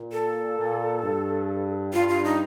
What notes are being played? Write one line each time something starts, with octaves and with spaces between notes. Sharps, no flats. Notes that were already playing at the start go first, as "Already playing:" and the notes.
Already playing: A#2
A4
A#2
G2
G2 F4
F4
D#4